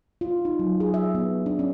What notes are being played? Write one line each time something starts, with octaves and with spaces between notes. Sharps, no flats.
F4
D#4
F#3
G#4
E5
B3
D4
C#4